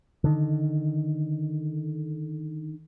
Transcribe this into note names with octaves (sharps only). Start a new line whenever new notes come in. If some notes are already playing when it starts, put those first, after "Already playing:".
D3 D#3